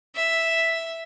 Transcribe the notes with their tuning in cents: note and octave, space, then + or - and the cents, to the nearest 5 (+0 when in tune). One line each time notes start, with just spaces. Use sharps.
E5 +0